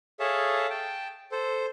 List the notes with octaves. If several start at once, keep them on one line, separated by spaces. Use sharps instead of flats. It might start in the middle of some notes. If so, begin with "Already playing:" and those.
G#4 A4 C#5 E5 F5 A5
G5 A5
A4 C5